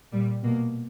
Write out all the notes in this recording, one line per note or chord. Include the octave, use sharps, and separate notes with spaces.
A#2 G3
B2 A#3